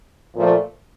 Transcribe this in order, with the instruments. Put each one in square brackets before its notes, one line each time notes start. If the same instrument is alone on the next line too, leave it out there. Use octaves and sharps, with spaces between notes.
[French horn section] A#2 F3 A3